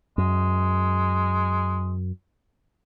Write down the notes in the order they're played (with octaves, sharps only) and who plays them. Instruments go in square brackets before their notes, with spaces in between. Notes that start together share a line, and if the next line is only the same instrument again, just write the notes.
[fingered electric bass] F#2 [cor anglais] G#3